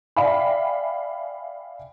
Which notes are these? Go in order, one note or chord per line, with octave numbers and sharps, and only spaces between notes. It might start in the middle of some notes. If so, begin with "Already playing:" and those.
D5 E5 F5 G5 G#5 B5